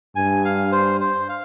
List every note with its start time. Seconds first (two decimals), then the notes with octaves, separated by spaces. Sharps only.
0.16 G2 G#5
0.45 F5
0.72 C5
1.01 C5
1.29 F5